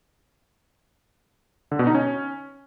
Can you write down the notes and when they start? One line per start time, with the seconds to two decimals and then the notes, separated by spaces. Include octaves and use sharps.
1.71 D3
1.79 B2
1.87 D#4
1.95 C#4